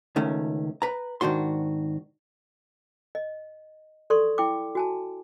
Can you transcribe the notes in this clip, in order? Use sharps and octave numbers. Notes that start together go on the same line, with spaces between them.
C#2 D#3 A3 C#4
B4 A#5
G#2 D#3 D4 F#4 C6
D#5
A4 D5 C6 C#6
E4 G5 D6
F#4 G#5 A5